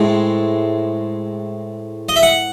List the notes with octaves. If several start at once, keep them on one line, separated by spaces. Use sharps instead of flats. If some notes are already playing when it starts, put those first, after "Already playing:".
Already playing: A2 G#3 C4
D#5
E5
F#5